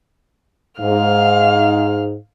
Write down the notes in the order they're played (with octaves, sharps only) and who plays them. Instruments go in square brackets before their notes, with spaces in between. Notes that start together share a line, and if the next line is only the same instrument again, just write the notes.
[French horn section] G#2 [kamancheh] F5 F6